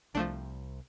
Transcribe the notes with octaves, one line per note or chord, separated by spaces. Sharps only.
C2 F3 A3 D4